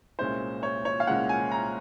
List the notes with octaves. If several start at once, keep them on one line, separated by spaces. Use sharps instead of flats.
C2 A#2 G#3 C#4 C5
C#5
C#5
F5
C2 A#2 G#3 C#4 F#5
G#5
A#5